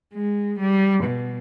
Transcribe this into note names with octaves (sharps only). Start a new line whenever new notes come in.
G#3
G3
B2